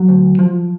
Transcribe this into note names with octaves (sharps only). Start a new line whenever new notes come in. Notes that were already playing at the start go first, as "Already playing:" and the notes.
Already playing: F#3
D2
F3